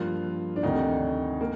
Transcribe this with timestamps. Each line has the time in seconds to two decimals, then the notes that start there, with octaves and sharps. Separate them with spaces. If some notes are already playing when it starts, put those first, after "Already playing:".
Already playing: G2 F3 A#3 F4
0.56 D4
0.63 D2 C3 D#3 D#4
1.41 A#3